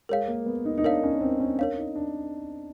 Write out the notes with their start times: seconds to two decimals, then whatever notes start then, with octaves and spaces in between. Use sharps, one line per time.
0.09 G#3 A#4 C#5 F5
0.28 A#3
0.46 B3
0.65 D#4
0.78 D#4
0.84 D4 A#4 C#5 F5
1.03 C#4
1.21 C4
1.40 C#4
1.58 D4 A#4 C#5 F5
1.78 D#4
1.96 D4